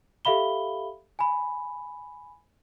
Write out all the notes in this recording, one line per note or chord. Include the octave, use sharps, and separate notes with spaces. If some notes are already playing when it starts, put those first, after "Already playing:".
G4 A4 E5 F5 B5 G7
G#5 B5